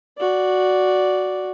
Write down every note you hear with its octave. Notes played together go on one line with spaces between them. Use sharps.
F#4 D5